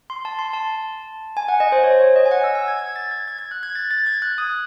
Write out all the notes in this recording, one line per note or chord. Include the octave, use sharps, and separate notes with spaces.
C6
A5
C6
A5
G#5
F#5
D#5
C5
C#5
C#5
D#5
G#5
F#5
E6
E6
G#6
G#6
A6
G#6
G#6
G#6
F#6
G#6
A6
A6
G#6
F#6
D#6